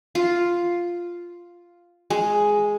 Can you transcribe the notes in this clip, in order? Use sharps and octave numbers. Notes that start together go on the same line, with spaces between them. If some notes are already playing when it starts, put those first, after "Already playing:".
F4
G#3